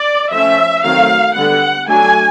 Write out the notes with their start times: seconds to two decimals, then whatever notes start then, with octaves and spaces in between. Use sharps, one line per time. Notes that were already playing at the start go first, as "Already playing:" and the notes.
Already playing: D5
0.32 F3 A3 C#4 E5
0.84 D#3 F#3 A3 C4 F5
1.36 D3 G3 B3 F#5
1.88 F#3 A3 D4 G#5